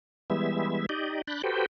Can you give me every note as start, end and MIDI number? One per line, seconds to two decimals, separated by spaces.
0.30 0.86 52
0.30 0.86 55
0.30 0.86 56
0.30 0.86 59
0.30 0.86 76
0.89 1.22 63
0.89 1.22 67
0.89 1.22 74
0.89 1.22 75
1.27 1.42 62
1.27 1.42 83
1.27 1.42 90
1.27 1.42 91
1.27 1.42 93
1.43 1.66 66
1.43 1.66 67
1.43 1.66 69
1.43 1.66 71
1.43 1.66 72
1.43 1.66 79